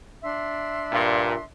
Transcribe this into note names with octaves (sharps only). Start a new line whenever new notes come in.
D4 E5 C6
G2 A#2